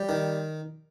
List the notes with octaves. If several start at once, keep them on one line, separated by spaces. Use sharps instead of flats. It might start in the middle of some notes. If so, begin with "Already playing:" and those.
Already playing: G3
D#3